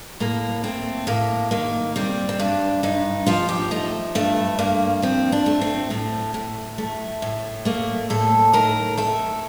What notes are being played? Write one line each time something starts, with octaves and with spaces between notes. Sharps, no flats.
A2 A#3
A3 C4
A2 A#3
D#3 A#3
G3 C4
C4
G2 D4
G2 D#4
F3 F4
G4
A3 D#4
G2 A3
G2 A#3
F3 C4
D4
A3
C4
A2 A3
A2
A3
A2
A3 A#3
A2 A4
D#3 A#4
A3 A4